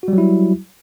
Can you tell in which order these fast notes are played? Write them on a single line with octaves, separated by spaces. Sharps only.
F#4 G3 F#3 E4